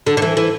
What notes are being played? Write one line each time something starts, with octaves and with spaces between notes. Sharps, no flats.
D3
D3
E3
E3